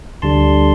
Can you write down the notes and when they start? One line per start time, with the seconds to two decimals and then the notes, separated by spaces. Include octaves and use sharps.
0.22 D2 D3 G3 A5 C6